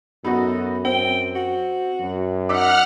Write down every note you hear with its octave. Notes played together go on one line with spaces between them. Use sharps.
F#2 B3 D#4 F#4 A4
C4 G5
F#4
F#2
D#4 F#5 D6 E6 F6 B6